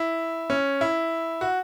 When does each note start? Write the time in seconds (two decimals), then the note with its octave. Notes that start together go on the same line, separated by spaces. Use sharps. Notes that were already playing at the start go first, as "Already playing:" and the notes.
Already playing: E4
0.50 C#4
0.81 E4
1.41 F#4